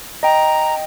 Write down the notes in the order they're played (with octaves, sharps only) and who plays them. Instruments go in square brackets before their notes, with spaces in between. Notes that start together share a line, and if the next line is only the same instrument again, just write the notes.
[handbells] D#5 G5 [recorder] A#5